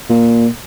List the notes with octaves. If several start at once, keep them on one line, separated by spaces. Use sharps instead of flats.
A#2